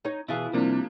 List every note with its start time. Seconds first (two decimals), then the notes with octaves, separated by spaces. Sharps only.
0.05 D#4 C#5
0.28 B2 E3 E4 F4 G#4 F5
0.53 C3 F3 G3 A#3 D4